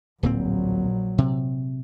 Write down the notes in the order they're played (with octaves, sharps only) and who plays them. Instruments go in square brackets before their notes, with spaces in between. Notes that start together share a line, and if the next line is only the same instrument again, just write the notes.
[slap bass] D1 A#2 C4 [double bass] A#1 F#3
[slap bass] C3